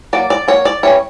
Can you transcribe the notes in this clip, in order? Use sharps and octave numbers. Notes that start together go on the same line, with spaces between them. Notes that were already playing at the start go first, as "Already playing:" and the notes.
F#3 A#3 D5
D5
F#3 A#3 C#5
D5
E3 G3 C#4 C#5